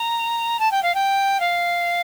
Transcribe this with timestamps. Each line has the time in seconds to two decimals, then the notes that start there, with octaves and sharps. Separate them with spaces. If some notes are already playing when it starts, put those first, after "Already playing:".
Already playing: A#5
0.59 A5
0.71 G5
0.82 F5
0.94 G5
1.40 F5